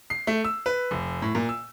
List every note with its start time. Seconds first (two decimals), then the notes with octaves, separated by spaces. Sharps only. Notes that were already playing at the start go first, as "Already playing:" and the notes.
0.10 C7
0.27 A3
0.45 E6
0.66 B4
0.91 F1
1.22 A2
1.35 A#2
1.49 E6